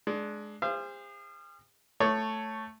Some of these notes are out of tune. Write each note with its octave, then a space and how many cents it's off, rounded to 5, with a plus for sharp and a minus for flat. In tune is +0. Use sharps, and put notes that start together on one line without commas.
G#3 +20 D4 +0
G#4 -45 C5 +0 F5 -35
A3 +0 C#5 +0 D#6 -45